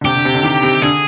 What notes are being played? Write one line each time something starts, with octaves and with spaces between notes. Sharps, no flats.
D3
C3 G4
D3
C3
D3
D#3
C3
D3 G#4